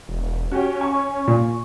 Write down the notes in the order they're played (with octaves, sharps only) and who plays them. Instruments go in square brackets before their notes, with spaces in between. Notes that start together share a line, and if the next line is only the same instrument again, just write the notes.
[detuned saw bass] E1
[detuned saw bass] C#4 [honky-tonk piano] F#4 G4
[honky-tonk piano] G#5 C#6
[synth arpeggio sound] A#2